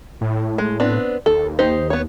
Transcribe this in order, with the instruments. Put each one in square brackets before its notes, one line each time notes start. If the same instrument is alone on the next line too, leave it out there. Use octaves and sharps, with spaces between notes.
[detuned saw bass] A2
[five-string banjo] G#3
B3 C4 D4
[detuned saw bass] D#2 [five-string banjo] A4
[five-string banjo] D#4 G4 C5
B3 C#5